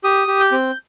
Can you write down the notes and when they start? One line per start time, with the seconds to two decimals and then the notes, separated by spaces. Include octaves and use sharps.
0.04 G4 D#6
0.28 G4
0.40 G6
0.52 C4